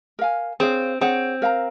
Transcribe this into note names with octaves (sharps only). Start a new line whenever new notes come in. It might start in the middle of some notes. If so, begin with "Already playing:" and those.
A#4 F5 G#5
C4 G#4 C#5 F5
C4 G#4 C#5 F#5
A#4 F5 A#5